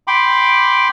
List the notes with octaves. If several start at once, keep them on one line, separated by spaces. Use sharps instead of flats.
G5 B5 C6 D6